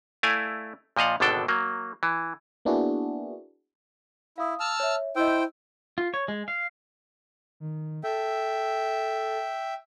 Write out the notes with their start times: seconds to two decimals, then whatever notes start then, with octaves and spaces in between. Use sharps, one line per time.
0.23 A3 E4 D5 F5 G#5
0.96 A#2 F3 D#5 F5 F#5
1.20 G#1 B2 D3 D4 A4 G5
1.48 F#3 A#3
2.03 E3
2.65 A#3 B3 D4 E4 F#4 G#4
4.38 E4 F5 D#6
4.60 A5 E6 F6
4.80 C#5 E5
5.16 E4 C5 D#5 G5 E6
5.98 F4
6.14 C#5
6.28 G#3
6.48 F5
7.60 D#3
8.04 A4 E5 G5